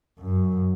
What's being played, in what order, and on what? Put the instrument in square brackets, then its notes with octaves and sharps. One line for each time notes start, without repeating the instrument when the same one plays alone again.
[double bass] F#2